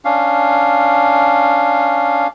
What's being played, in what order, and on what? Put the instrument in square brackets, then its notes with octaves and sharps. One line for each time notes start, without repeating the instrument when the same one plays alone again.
[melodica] C#4 D4 F5